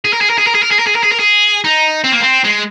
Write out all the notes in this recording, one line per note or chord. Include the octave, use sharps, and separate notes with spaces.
G#4
A#4
G#4
A#4
G#4
A#4
G#4
A#4
G#4
A#4
G#4
A#4
G#4
A#4
G#4
D#4
C4
A#3
C4
G#3